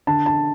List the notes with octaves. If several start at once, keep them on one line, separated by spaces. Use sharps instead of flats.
D3 A5
A5